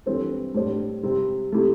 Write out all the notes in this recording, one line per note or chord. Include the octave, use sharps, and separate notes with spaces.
G2 E3 C4 A4 C5
A2 G3 D4 G4 C5
C3 G3 C4
C3 A3 E4 G4